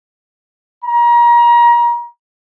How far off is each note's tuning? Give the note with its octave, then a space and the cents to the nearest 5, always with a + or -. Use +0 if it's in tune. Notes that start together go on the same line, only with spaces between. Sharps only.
A#5 +30